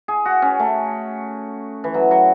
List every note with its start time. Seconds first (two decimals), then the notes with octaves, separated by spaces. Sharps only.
0.08 G#4
0.25 F#4
0.42 C#4
0.60 A3
1.84 E3
1.94 F#3
2.11 F#3